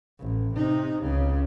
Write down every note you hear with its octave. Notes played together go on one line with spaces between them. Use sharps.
A1
C3 D#4
C#2 C#3